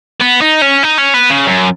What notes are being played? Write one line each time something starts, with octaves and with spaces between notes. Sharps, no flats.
B3
D#4
C#4
D#4
C#4
B3
C#3
F#2